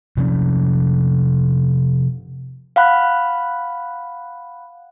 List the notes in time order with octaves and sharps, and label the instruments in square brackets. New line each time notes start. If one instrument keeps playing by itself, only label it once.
[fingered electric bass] C3 F3 C#4
[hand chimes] F5 F#5 B5 F#6